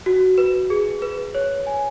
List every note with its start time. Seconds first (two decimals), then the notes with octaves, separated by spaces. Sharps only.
0.06 F#4
0.38 B4
0.70 G#4
1.02 B4
1.35 C#5
1.67 G#5